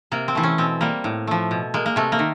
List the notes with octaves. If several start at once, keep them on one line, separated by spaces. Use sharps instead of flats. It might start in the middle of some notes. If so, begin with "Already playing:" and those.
C3 A#3
C4
E3 A3
C#4
B2 C4
G3 A#3
A2
F3 A3
B2
G#3 A#3
A#3
C3 A3
A#3
D#3